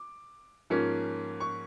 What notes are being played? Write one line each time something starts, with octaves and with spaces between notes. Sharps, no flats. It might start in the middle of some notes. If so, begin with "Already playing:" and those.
Already playing: D6
G#2 F3 A#3 C#4
C#6